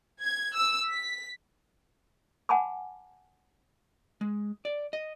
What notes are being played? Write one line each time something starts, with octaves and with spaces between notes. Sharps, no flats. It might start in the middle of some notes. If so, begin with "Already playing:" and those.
G#6
E6
B6
F#5 G#5 A5 B5 D6
G#3
D5
D#5